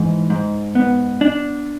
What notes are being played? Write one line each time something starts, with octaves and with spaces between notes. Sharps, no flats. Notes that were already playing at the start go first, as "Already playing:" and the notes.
Already playing: G#2 E3
G#2
B3
D4